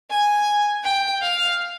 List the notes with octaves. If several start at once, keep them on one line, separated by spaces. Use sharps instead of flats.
G#5
G5
F5